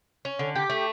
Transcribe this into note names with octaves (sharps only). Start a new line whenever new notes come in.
C#4
D3
G4
A3